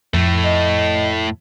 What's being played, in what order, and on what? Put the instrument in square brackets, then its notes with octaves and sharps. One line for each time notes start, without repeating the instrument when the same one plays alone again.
[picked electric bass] F2 [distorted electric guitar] A2 A3
[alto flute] D#5